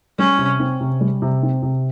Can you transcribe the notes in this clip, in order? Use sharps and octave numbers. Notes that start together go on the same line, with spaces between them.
G3 C#4
C3
C4
C3
G3
C3
C4
C3